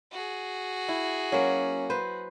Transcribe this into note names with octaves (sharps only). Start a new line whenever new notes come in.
F#4 G#4
E4
F#3 A#3 C#4
B4 C5